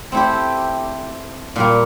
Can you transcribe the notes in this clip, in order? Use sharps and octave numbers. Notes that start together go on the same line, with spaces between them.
A3 C4 E4 G4
A#2 G3 A#3